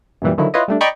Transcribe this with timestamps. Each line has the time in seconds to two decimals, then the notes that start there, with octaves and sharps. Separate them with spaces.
0.22 F#2 A#2 E3 G3
0.38 D3 D#3 F3 F#3 E4
0.54 E4 F4 B4 C#5 D#5
0.68 G3 A3 D4
0.81 D5 D#5 G5 A#5 B5 C#6